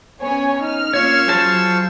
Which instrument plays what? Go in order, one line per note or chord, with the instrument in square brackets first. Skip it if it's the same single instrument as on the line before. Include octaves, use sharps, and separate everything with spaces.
[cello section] B3 C#4 [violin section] C#5 G#5
[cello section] D#4 [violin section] F6
[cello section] A#3 C#4 [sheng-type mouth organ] F4 C#6 E6 [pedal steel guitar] C#5
[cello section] F#3 [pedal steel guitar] G#4 C5 A5